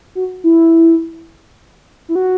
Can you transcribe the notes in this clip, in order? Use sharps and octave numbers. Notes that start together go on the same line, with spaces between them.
F#4
E4
E4
F#4